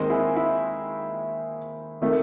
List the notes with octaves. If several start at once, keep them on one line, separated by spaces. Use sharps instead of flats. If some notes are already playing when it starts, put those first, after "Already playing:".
Already playing: D#2 D#3 G#3 C4 C5 D#5
E4 G#4
E4
C3 D#3 A3